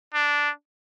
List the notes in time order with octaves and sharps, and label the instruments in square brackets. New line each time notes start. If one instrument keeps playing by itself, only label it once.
[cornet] D4